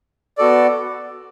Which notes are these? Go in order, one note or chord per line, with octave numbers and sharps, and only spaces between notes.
B3 F#4 A4 D5